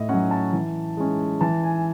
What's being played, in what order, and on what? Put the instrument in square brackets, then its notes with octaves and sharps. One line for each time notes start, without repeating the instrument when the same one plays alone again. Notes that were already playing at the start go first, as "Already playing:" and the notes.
Already playing: [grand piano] A2 D#5 E5
F#3 C#4 F#5
A5
E3
G#3 C#4
E3 A5
G#5